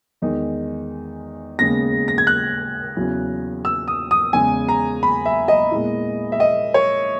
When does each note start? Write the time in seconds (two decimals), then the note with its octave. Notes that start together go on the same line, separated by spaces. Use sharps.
0.22 E2 D#3 G#3 D#4
1.59 D#2 C#3 G#3 B3 A#6
2.08 A#6
2.18 G#6
2.27 F#6
2.96 E2 C#3 F#3 C#4 E4
3.65 E6
3.88 D#6
4.11 D#6
4.33 E2 C#3 G#3 G#5
4.68 A#5
5.03 B5
5.26 E5
5.48 D#5
5.71 A#2 G#3 B3 E4
6.32 E5
6.40 D#5
6.74 C#5